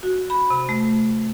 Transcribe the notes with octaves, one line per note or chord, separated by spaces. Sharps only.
F#4
B5
C3
A3